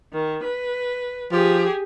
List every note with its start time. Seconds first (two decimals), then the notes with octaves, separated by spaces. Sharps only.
0.13 D#3
0.44 B4
1.32 F3 G4 G#4